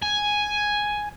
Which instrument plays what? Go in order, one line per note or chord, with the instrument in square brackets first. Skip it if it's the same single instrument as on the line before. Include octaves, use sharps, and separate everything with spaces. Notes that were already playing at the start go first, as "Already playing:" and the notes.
[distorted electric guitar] G#5